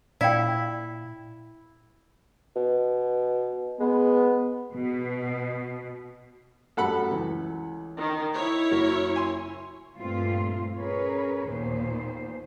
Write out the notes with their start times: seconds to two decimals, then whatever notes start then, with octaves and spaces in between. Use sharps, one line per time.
0.21 A#2 E4 D5 F5 G5
2.56 B2
3.80 G#3 B3
4.73 B2
6.77 F#2 G3 A3 A4 F#5 B5
7.11 C#2 E3
7.99 D#3
8.35 E4 C#5
8.71 F#1 F#3 A#4
9.16 G#5 C6
9.98 G2 A#2 A3 C4 F4
10.77 C#4 G#4 A#4 B4 C#5
11.47 D#2 A#2 B3 C5